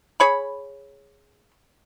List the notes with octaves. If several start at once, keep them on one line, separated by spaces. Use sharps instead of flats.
G#4 C#5 B5